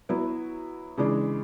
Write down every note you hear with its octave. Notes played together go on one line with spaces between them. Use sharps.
F#3 B3 E4
C#3 E3 G#3 D4